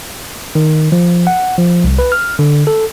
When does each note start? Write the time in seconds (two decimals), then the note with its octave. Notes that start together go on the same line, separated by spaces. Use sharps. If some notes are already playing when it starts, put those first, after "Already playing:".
0.55 D#3
0.92 F3
1.27 F#5
1.58 F3
1.84 C2
1.99 B4
2.12 F6
2.39 D3
2.67 A4